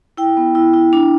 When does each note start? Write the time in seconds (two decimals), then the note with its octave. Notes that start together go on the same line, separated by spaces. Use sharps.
0.17 E4 G5
0.37 B3
0.55 E4
0.74 E4
0.93 D4